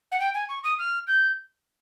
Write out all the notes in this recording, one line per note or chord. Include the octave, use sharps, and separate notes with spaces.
F#5
G5
G#5
C#6
D#6
F6
G6